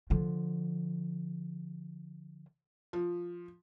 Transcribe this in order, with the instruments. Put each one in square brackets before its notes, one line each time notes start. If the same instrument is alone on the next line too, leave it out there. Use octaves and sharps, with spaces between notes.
[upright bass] D3 F3
[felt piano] F3